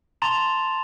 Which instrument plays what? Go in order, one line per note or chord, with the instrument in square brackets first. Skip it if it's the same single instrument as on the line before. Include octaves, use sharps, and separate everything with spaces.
[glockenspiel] A5 A#5 C6 A6 E7 F7